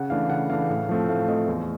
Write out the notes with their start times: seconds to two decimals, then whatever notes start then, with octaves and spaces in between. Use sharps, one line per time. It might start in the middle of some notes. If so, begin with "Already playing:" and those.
Already playing: C#3 F#5
0.10 E3 A3 D4 F5
0.30 C#3 F#5
0.50 E3 A3 D4 F5
0.70 A2
0.89 F3 A3 C4
1.09 A2 F5
1.28 F3 A3 C4 D#5
1.48 E2